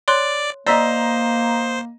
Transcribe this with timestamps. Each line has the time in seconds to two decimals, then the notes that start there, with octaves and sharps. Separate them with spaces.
0.08 C#5 D5 C6 F#6
0.67 A#3 C5 D5 D#5 A#5 E6 B6